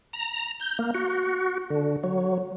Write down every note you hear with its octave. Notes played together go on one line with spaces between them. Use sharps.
A#5
G6
A#3
F#4
D3
F#3